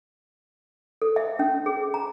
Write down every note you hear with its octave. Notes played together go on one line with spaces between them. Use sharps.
A4
E5
C#4
G#4
A#5